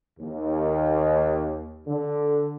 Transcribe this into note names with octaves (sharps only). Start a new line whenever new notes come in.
D#2
D3